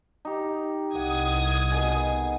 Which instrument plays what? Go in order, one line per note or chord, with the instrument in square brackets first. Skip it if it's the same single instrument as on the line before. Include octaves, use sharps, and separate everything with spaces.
[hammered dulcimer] D#4 G4
[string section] C2 D#6 G#6 [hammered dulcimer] F#5
[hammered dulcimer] B2 D#3 G#4